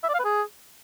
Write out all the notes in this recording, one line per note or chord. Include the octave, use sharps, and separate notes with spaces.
E5
D5
F5
B4
G#4